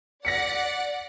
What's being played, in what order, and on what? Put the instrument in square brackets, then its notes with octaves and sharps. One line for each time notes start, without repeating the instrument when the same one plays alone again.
[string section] D5 F#5 [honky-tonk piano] A#6 B6 C#7